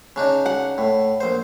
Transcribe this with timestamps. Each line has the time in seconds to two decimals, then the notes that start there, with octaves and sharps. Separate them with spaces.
0.16 C#3 D4 D#4
0.46 F#5
0.78 A2
1.21 A#1 C5